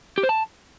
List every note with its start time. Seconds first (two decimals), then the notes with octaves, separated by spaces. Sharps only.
0.18 G4
0.23 C5
0.29 A5